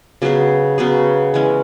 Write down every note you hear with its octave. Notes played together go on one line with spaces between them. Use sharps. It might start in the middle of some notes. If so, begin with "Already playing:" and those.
C#3 F#3 B3 G#4
C#3 F#3 B3 G#4
E3 G#3 C#4